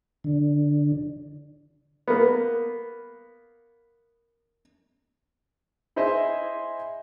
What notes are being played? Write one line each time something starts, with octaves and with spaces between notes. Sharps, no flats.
D3
A#3 B3
E4 G#4 C5 D#5 E5